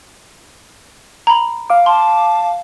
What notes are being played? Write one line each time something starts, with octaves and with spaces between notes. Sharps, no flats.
A#5 B5
F5 D6
A5 C6